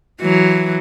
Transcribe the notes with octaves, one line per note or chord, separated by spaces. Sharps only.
E3 F#3